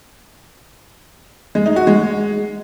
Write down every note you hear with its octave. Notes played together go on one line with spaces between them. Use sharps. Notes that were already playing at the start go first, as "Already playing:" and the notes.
G#3
D#4
F#4
G#3